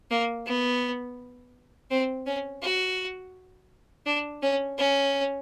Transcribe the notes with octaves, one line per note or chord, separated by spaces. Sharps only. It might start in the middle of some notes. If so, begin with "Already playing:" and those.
A#3
B3
C4
C#4
F#4
D4
C#4
C#4